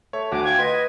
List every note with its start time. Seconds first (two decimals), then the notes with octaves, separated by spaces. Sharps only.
0.13 A3 C#5
0.32 D2 F#4 D6
0.44 F4 G5 G#6
0.58 B4 D#5 C6